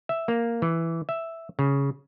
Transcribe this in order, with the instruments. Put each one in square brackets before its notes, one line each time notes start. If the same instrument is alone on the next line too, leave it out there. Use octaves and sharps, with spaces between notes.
[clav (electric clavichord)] E5
A#3
E3
E5
C#3